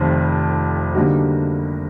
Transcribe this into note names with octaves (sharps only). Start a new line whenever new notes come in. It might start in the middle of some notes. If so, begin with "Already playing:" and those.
Already playing: F1 F2 C3 D#3
D3 G3 A#3 D#4 F#4